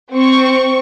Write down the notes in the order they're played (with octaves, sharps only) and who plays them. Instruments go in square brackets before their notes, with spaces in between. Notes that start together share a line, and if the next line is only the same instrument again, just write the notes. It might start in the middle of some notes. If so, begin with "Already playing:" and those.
[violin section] C4 C#6